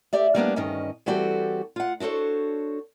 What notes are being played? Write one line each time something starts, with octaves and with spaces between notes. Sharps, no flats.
G4 D5 E5
G3 A#3 B3 D4
D2 G2 D#3 C#4 D#5
E3 G3 C4 F#4 G4 A4
F4 F#5
D4 F#4 A4 C5 C#5